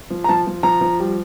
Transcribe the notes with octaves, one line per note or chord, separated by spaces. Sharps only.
F3
A#5
F3 A5
F3
F3 A#5
F3
G3